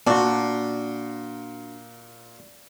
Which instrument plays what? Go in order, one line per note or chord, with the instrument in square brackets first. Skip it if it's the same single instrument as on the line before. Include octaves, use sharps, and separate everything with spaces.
[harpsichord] A#2 [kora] D4 F#4